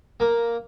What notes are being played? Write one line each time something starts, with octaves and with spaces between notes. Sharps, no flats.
A#3